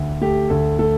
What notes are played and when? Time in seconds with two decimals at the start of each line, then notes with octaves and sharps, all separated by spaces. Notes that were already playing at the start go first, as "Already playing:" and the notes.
Already playing: D2
0.21 A3 G4
0.50 D2 A4
0.79 A3 A4